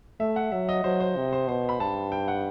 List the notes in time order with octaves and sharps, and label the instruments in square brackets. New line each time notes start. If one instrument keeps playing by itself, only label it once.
[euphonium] A3 [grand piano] E5
[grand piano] F#5
[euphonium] F#3 [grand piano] E5
[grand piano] D#5
[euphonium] F#3 [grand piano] C5
[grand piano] C5
[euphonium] C3
[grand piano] C5
[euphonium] B2 [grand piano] C5
[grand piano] B5
[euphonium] G2 [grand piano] A5
[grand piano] G5
F#5